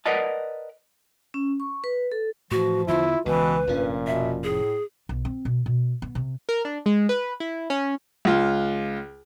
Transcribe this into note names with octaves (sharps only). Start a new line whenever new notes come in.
A#4 B4 D5 D#5 F#5 A5
C#4
C#6
B4
A4
A2 E3 F3 F#4
E2 D3 E3 E4 F4
C#2 B2 E3 B4
F1 G2 A#2 F3 C#4
B2 E5
A2 G#4
B1
C4
B2
B2
B3
C3
A#4
D4
G#3
B4
E4
C#4
C#2 F4